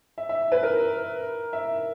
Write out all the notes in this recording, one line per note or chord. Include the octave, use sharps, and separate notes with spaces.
E5
E5
B4
A#4
E5